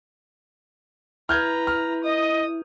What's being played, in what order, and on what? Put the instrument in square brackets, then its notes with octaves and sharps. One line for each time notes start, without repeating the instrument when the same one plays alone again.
[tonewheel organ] E4 [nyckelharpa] B4 A#5 [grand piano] F6 G6 G#6
[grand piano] F6
[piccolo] D#5 [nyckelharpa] D#6